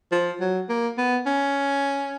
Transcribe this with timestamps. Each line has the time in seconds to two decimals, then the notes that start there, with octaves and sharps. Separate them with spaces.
0.12 F3
0.40 F#3
0.69 A#3
0.98 B3
1.26 C#4